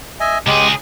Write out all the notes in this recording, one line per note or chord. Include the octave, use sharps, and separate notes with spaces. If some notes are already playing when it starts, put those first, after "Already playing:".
D#5 E5 G#5
C#2 G#3 G4 G#4